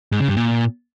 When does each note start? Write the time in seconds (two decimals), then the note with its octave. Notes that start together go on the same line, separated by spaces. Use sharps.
0.12 G#2
0.20 C#3
0.28 G2
0.36 A#2